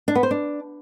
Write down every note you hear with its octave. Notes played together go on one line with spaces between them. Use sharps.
D4
B3
C5
D4